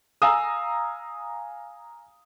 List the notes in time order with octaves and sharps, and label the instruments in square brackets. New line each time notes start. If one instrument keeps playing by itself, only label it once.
[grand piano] F5 G#5 A#5 D#6 E6